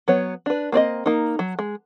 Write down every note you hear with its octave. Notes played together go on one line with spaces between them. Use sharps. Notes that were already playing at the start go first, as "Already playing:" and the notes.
F#3 B3 C#5
D4 B4
A#3 C4 D5 D#5
A#3 D#4
F#3
G#3